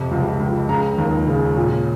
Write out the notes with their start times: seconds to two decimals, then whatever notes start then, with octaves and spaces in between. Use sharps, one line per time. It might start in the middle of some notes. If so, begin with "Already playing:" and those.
Already playing: F2 C3
0.11 C#2
0.40 C#2
0.69 C#3 A#5
0.98 D#2
1.27 C#3
1.56 A#2